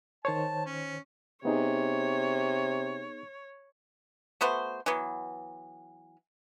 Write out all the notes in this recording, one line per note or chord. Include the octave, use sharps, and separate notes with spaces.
D#3 C5 C#5 A5
C#4
C3 B3 D#4 G#4 C#5
A3 B3 F#4 C5
E3 F#3 B3